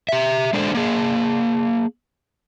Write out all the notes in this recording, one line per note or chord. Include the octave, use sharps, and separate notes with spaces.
G4 E5
G#3 D4 A4 C5 D5
A#3 G#4